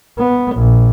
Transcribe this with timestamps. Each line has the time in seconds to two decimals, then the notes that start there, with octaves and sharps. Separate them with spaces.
0.18 B3
0.54 A#1